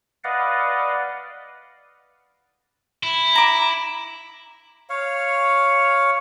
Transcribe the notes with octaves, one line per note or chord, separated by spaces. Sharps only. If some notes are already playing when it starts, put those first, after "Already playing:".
B4 D5 D#5 F5 F#5
E4
A#5 D6
C#5 F5